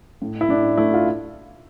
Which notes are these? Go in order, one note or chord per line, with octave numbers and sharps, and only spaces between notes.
A2
E4
A2 D4
A3 E4
F4